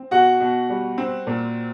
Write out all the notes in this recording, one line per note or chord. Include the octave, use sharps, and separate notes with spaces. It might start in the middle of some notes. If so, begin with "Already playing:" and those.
Already playing: C4
B2 F#4 F#5
B2
G3
C4
A#2